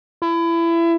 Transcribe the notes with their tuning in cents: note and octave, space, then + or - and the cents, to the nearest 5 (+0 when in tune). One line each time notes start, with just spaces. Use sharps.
E4 +25